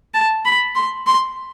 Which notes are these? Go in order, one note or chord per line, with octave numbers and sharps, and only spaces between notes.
A5
B5
C6
C6